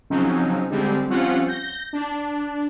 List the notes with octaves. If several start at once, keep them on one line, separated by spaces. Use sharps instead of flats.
C#3 F3 F#3 C4 C#4 D#4
D3 G3 G#3 C4
F3 G3 C4 C#4 F4 F#5
G6 A#6
D4